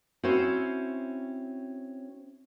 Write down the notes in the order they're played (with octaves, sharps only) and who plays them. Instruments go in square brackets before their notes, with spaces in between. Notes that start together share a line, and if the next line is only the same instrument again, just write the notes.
[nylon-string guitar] C4 C#4 E4 F#4 C5